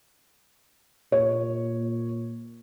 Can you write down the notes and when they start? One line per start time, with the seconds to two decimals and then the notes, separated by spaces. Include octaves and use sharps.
1.12 A#2 C#5